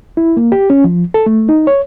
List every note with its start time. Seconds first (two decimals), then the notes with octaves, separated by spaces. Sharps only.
0.17 E4
0.37 A#3
0.52 G4
0.70 C#4
0.84 F3
1.14 A4
1.26 A3
1.49 D#4
1.67 C#5